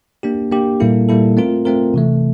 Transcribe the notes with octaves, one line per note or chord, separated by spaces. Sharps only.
A#3 D4 G4
A#3 D4 G4
A#2 G3 A#3 E4 A4
A#2 G3 A#3 E4 A4
A3 C4 F4 A#4
A3 C4 F4 A#4
C3 E3 A3